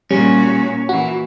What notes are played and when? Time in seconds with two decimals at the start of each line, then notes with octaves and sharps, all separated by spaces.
0.11 A#2 G3 C#4 F#4
0.89 A#2 E3 F#4